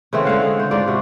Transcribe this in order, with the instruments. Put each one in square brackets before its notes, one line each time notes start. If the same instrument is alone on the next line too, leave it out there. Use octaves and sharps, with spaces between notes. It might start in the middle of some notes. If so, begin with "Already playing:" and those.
[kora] C#3 E3 A3 C4
D3 G#3 F5 F#5
G#4
C5
G#2 F4 D5
C3 F#4